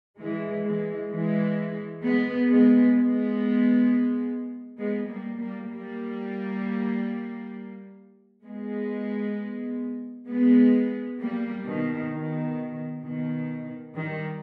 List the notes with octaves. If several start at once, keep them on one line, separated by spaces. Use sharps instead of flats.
E3 G#3
E3 G#3
E3 G#3
G#3 B3
G#3 B3
G#3 B3
G#3 B3
G3 A#3
G3 A#3
G3 A#3
G#3 B3
G#3 B3
G3 A#3
B2 D#3
B2 D#3
B2 D#3
D#3 G3